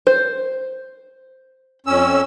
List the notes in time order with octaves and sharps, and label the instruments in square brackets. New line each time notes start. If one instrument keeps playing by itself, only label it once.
[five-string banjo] C5
[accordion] F2 C#4 E6